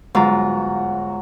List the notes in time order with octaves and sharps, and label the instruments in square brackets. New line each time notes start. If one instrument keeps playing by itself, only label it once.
[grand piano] G1 F#4 A#5 [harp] G#2 F4 [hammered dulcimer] F#3 C#6